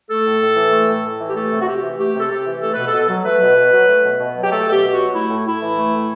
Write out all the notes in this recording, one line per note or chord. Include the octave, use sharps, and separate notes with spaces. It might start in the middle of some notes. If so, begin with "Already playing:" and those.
A3 A4
A2
A2
E3
A3
A2
A2
E3
G4
A3 A4
C3
F#4
C3 G4
E3
A3 G4
C3
A4
C3 G4
E3
A3 A4
B2 B4
A4
B2
F#3
A3 B4
B2
B2
F#3
A3
B2
B2
F#3
G4
A3 A4
B2 A4
G4
B2
F#3 F#4
A3 E4
A2
A2 E4
E3
A3
A2